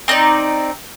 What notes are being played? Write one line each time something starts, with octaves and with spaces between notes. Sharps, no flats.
C4 D#4 A4 D5